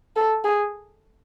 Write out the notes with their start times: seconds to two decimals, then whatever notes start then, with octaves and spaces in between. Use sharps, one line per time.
0.16 A4
0.44 G#4